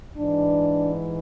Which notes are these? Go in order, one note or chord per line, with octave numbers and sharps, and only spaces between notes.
G#2 E3 D4